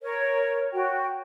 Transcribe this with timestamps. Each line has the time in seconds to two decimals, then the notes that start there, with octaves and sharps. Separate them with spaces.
0.02 A#4 C#5
0.72 F#4 G5